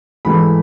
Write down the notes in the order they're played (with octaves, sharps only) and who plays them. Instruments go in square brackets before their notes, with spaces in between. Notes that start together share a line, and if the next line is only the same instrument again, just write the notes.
[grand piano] G#2 E3 A3 B5